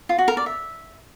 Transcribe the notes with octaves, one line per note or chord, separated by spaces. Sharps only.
F4
F#4
A#4
D5
E5